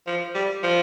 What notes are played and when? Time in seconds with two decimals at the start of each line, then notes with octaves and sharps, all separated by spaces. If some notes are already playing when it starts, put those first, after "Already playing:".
0.07 F3
0.35 G3
0.63 F3